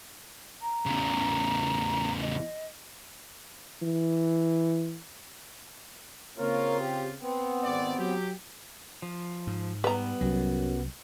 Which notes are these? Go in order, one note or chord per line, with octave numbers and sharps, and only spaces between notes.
A#5
E2 C#3
D#5
E3
C#3 A#3 C4 F4 A#4 C#5
G4
B3 C4
G#1 D5
F#3 G4
F3
G#2
G3 B3 B4 A#5
C2 F#2 F#3